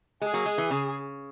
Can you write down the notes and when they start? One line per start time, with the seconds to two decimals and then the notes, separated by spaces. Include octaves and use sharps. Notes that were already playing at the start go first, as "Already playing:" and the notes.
0.22 G#3 G#4
0.34 F#3 A#3
0.46 G#3
0.58 E3
0.70 C#3